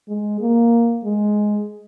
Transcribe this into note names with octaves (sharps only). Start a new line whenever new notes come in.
G#3
A#3
G#3